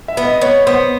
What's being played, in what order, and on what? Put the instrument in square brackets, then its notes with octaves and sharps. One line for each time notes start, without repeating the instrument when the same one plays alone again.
[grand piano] E5
[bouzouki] B3
[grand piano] D#5
[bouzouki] B3 [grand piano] C#5
[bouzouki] B3 [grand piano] C5